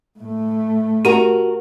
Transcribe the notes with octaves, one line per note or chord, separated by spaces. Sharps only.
A2 A3
F#4 G4 A#4